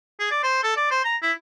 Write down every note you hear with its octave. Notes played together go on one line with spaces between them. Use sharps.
G#4
D5
C5
A4
D5
C5
A#5
E4